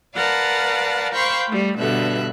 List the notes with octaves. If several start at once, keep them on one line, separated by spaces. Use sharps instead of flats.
A#4 B4 D5 F5 F#5 A5
C5 F5 G5 B5 C#6
G3 A3
G2 B2 D3 E5 F#6